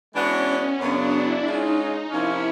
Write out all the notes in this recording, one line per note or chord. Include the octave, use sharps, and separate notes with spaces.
E3 G#3 B3 C#4 D4 F#4
F#2 C#3 F#3 B3 D4
E4
G#3 C#4 D#4 F4 G#4
C3 F3 A#3 C#4 E4